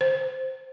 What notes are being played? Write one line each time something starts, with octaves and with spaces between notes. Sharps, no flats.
C5